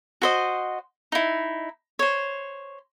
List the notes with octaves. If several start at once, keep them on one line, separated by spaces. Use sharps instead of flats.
F#4 C5 D#5
D#4 E4
C5 C#5